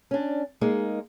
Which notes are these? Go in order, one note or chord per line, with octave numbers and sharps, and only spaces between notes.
C#4 D4
G#3 A#3 D#4